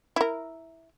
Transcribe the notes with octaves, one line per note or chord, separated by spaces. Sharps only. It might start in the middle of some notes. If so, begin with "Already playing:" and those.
E4 A#4